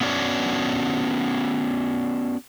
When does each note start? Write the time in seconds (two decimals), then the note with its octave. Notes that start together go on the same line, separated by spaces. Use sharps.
0.01 B3 C#4 D4 F#4 C#5 D5